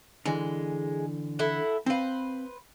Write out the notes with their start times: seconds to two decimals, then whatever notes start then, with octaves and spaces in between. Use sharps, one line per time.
0.26 D3 E3 G#3
1.39 E4 A4 F#5
1.86 C4 B4 C5 F5